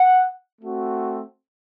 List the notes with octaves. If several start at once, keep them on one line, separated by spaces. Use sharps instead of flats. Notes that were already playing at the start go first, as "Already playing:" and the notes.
Already playing: F#5
A3 C4 F#4